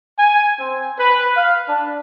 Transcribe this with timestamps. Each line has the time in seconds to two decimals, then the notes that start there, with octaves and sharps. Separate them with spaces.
0.19 G#5
0.60 C4
0.98 B4
1.37 F5
1.69 D4